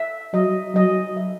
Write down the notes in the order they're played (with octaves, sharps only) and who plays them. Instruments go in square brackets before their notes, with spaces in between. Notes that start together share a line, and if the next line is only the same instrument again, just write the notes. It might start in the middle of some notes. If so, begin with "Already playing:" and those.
Already playing: [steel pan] E5
[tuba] F#3 [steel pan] D#5
[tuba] F#3 [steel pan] D#5
[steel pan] E5